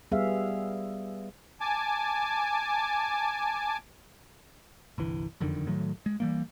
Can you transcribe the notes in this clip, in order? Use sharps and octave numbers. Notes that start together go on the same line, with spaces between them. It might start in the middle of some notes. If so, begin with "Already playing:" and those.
G3 B3 G#4 E5 F5
G#5 A5 D6
G1 C2 E3
F#1 F2 D3 D#3
A2 D#3 F#3 A3
G#3
E3 G3 A#3